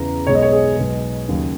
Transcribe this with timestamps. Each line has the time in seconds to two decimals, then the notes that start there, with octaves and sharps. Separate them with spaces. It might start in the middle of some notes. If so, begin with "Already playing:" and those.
Already playing: E2 C#3 E3 A#5
0.27 B1 B2 G#3 B3 C#5
0.35 D#5
0.42 C#5
0.52 G#4
0.77 B1 B2 G#3
1.29 D#2 C#3 F#3 A#3